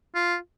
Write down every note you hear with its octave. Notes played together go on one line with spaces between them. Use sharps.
F4